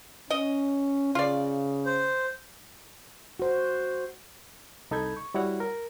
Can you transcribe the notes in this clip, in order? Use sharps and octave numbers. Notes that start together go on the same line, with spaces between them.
C#4 D#5
C#3 F4 D5
C5
F#4 C5
C2 D#4 A4 B5 G6 G#6
C#6
G3 E4 F#4 C#5 F#5
A#4